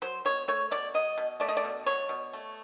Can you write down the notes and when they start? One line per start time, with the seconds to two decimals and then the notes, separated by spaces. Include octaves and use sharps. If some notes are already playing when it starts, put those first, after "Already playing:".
0.02 F#3 C5
0.25 B2 C#5
0.48 A3 C#5
0.71 B2 D5
0.94 F#3 D#5
1.18 B2
1.40 A3 D5
1.49 D#5
1.57 D5
1.64 B2
1.86 F#3 C#5
2.09 B2
2.33 A3